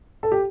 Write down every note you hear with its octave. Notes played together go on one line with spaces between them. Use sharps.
A4
G4